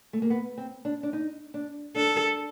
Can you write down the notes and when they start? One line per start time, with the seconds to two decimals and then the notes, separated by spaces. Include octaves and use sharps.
0.13 A3
0.22 A#3
0.30 B3
0.58 C4
0.85 D4
1.03 D4
1.13 D#4
1.54 D4
1.96 D4 A4